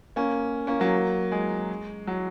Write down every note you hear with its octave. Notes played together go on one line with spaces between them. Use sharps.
A#3 C#4
A#3 C#4
F#3 A#3
G#3
F#3